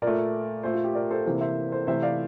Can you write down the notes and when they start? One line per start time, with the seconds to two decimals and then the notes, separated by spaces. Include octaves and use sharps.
0.02 A#2 A#4 D5
0.07 A3
0.63 A#2 A3 A4 C5
0.74 F4
0.84 G4
0.95 A#4 D5
1.10 A4 C5
1.26 C3 E3 A#3
1.41 C5 E5
1.72 A4 C5
1.87 C3 E3 A3 C5 E5
2.02 D5 F5